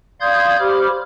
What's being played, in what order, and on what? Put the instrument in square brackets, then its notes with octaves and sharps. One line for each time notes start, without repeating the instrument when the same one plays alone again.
[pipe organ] D5 F5 C6 D#6 G6 G#6
G4 C5 B5 D6 F6